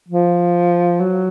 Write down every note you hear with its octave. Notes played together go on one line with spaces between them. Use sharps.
F3
F#3